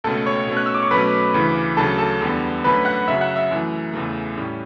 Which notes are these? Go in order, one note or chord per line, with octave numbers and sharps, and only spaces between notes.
C#2 B2 A3 C#4 A4 A5
C#5 C#6
B2 A3 C#4
F#6
E6
D6
C#6
B2 F#3 A3 C#4 B4 B5
D2 C#3 E3
D2 C#3 F#3 A3 C#4 A4 A5
A4 A5
E2 D3 G3 B3
F#2 D3 A3 C#4 B4 B5
F#5 F#6
F#2 C#3 F#3 C#4 E5 E6
F#5 F#6
E5 E6
F#2 E3 A3
E2 C#3 E3 A3
A2 G3 C#4